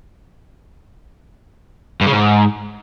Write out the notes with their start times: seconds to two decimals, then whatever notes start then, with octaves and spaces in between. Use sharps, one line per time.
2.01 G2
2.07 C#3
2.12 G#2